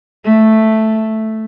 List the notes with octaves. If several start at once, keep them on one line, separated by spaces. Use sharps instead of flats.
A3